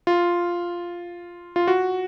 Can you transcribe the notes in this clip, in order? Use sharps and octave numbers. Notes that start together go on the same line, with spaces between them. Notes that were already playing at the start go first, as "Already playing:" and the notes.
F4
F4
F#4